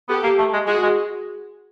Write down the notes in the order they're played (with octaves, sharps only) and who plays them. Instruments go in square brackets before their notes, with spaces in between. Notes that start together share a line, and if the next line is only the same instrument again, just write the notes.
[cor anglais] B3 [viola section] G4 A4
[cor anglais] A#3
A3
G#3
[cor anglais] G#3 [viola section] F#4 G#4
[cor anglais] G#3